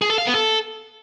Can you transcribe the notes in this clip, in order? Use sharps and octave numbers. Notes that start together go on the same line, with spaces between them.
G#4
A4
F5
B3
A4